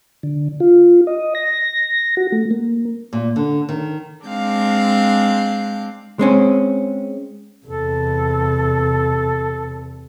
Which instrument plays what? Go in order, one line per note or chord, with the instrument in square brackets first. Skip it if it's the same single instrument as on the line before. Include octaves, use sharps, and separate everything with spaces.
[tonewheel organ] D3
F4
D#5
A#6
F#4
A3
A#3
[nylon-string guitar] A#2
D3
D#3
[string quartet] G#3 C4 D4 F5 G6
[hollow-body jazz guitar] G#3 C4 C#4
[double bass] E2 C3 [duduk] A4